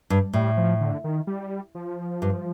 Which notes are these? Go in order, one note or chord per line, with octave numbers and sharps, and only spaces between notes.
G2
A2 G3
F3
D3
D#3
G3
F3
G2